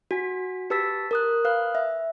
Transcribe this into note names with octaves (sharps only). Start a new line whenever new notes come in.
F#4 G#5 B6
G4 B4 A5 E6 A6 B6
A#4 D#6 F#6
B4 F5 D#6 F6 F#6
E5